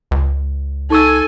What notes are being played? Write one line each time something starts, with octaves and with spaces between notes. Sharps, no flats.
C#2
D#4 A4 G#5 C#6 E6